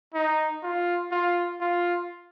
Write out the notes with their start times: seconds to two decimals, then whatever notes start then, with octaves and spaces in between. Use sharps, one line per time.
0.14 D#4
0.63 F4
1.11 F4
1.61 F4